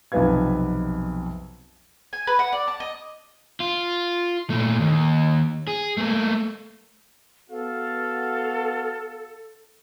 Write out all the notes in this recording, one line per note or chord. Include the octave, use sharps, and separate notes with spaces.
B1 F2 C3 B3 F5 G#6
G#5
B4
F#5
D5
A5
D#5
F4
A#2 A3
D#2
G#4
A3 A#3
B3 F#4 A4 F5